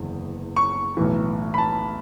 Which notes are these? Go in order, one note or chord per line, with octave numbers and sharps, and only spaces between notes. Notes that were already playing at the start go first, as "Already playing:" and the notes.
Already playing: F#1 E2 D3
C#6
B1 A2 E3
B5
A5